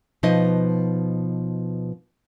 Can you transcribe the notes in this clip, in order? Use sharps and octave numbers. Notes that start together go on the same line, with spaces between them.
B2 F3 D#4 D#5